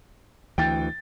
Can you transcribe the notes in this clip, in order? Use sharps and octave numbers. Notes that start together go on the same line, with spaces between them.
D2 E3 G5 A6